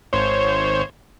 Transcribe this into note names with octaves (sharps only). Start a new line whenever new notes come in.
G#1 C5 C#5